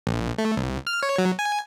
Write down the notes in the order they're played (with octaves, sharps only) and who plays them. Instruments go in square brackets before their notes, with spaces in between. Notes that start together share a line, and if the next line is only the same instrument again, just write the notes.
[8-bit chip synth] A#1
A3
C2
F6
C#5
F#3
G#5